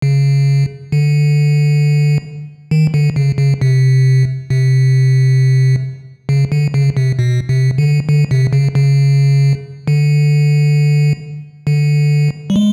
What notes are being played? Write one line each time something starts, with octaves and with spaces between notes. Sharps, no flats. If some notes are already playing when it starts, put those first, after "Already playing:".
C#3
D3
D#3
D3
C#3
C#3
C3
C3
C#3
D3
C#3
C3
B2
C3
D3
D3
C3
C#3
C#3
D3
D3
G3
G#3